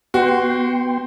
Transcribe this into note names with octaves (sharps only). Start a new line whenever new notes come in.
B3 F#4 G5 C6